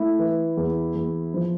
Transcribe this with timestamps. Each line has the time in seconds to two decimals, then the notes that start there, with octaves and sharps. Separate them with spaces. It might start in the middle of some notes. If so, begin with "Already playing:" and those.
Already playing: A3 E4
0.19 E3
0.57 E2
0.95 E2
1.34 F3